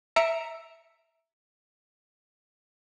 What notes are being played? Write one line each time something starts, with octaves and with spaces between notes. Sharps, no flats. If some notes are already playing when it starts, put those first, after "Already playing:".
E5 A#5 A#6 C#7 D7